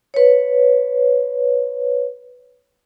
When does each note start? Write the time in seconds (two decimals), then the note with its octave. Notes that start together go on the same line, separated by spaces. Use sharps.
0.14 B4 C#5